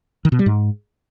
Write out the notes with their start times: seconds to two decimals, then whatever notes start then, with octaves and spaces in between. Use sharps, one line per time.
0.25 D#3
0.32 B2
0.39 G3
0.46 G#2